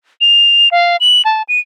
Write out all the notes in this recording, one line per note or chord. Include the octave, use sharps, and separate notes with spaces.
F7
F5
F#7
A5
D#7